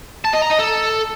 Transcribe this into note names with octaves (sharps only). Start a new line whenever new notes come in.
A5
D#5
A#5
D#5
A4